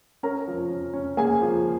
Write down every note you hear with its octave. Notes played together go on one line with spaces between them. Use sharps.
C#4 A#4 A#5
F3
C#4
C#4
A#3 G#4 G#5
F3